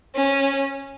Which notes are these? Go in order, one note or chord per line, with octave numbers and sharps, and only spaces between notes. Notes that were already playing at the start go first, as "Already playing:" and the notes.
C#4